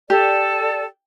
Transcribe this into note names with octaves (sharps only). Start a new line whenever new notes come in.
G4 A4 D5